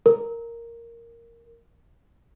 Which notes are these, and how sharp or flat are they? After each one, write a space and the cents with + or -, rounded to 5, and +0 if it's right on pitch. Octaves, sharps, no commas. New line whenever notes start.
A#4 -5